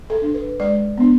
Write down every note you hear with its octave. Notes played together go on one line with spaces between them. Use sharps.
A4
D4
B4
G#3 D5
B3 D4